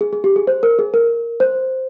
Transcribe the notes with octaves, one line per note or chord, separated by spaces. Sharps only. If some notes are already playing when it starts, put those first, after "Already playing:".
G#4
G#4
G4
G#4
C5
A#4
G#4
A#4
C5